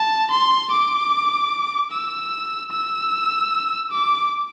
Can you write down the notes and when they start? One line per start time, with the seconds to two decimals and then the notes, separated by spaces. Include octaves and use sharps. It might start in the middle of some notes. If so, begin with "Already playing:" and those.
Already playing: A5
0.31 C6
0.71 D6
1.91 E6
2.71 E6
3.91 D6